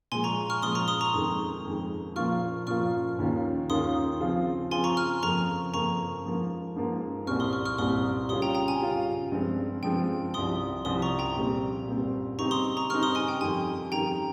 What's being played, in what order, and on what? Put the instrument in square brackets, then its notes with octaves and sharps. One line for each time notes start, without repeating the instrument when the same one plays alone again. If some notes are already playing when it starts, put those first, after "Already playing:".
[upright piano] A#2 F3 G#3 [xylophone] G#5 C6
[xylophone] A#5 C#6
C#6 F6
[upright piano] A#2 F3 G#3 [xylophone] C6 D#6
[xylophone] A#5 C#6
C6 D#6
A#5 C#6
[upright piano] F2 D#3 G#3
F2 D#3 G#3
[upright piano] A#2 F3 A#3 F4 [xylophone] C#6 F6
[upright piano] A#2 F3 A#3 F4 [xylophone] C#6 F6
[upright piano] D#2 D#3 A#3 C#4 F4
[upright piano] D#2 D#3 A#3 C#4 F4 [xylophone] C6 D#6
[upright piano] C#3 F3 C4 F4
[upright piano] C#3 F3 C4 F4 [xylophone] G#5 C6
[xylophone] A#5 C#6
C#6 F6
[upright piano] F2 C#3 F3 A#3 [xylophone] A#5 C#6
[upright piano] F2 C#3 F3 A#3 [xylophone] A#5 C#6
[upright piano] G#2 F3 A#3
G#2 F3 A#3
[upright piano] C2 A#2 G3 C4 [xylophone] C#6 F6
[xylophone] C6 D#6
C#6 F6
C#6 F6
[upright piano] C2 A#2 G3 C4 [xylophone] C6 D#6
[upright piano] C#3 G3 C#4 F4 [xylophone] C6 D#6
[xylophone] G5 A#5
G5 A#5
G#5
[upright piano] C#3 G3 C#4 F4
G2 F3 G#3 C4
[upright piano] G2 F3 G#3 C4 [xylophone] G5
[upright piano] C2 C3 F3 [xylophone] C6 D#6
[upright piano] C2 C3 F3 [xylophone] C6 D#6
[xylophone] A#5 C#6
G5 A#5
[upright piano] A#2 G3 C4
A#2 G3 C4
[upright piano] C#3 G3 C4 D#4 [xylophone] A#5 C#6
[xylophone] C6 D#6
A#5 C#6
[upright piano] C#3 G3 C4 D#4 [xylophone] C#6 F6
[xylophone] C6 D#6
G#5 C6
G5
[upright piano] F2 D#3 G3 [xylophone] G#5
[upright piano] F2 D#3 G3 [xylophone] G5 A#5